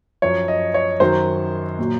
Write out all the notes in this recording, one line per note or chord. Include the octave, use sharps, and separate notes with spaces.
F#2 F3 C#5
D#5
C#5
F#2 D#3 F#3 C5
A#2 F#3